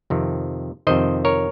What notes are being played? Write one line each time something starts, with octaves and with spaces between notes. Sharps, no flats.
F2 C3 D#3
F2 C3 D#3 C5 D#5
A#4 C#5